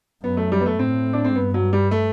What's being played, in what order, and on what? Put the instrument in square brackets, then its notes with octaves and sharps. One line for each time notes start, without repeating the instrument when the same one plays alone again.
[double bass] F#2 [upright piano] B3
[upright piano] A3
G3
B3
A3
[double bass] A2 [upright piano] C4
[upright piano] D4
C4
[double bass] G2 [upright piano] B3
[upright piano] F#3
G3
A3